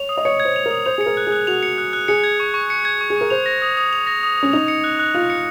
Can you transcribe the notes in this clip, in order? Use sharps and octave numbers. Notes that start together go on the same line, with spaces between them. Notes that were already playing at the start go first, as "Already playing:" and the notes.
Already playing: C#5 F7
D#6
D#5
C#5 C#7
G#6
C5
F7
A#4
D#6
C5 F7
G#4 C#7
A#4
F#6
G#4
F#6
F#4 F7
C#7
F#6
F#6
G#4 C#7
G#6
C#6
C#6
C#7
G#6
C#6
G#4
A#4 C#6
C5 F7
A#6
D#6
D#6
F7
A#6
D#6
C#4 D#6
D#4 F7
C#7
F#6
F#6
F4 F7
C#7